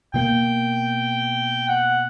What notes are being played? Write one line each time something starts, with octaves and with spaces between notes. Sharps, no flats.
B2 A#3 G5
F#5